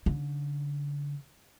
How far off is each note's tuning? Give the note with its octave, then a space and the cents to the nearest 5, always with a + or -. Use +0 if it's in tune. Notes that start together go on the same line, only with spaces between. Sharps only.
D3 -35 D#4 -45